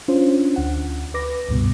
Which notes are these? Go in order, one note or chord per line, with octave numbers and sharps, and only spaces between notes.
C#4 D4 F4 C5
D2 F#5
B4 D6 A#6
C#2 G2 B2